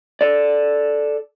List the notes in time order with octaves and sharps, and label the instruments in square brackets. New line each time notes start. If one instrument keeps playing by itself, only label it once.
[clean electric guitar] A4 D5